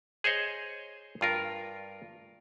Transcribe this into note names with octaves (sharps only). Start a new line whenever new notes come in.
G#4 C5 C#5 D#5
G2 F4 A#4